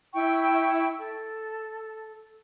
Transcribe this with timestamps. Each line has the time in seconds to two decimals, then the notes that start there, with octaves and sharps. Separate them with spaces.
0.14 E4 E5 G5 C#6
0.98 A4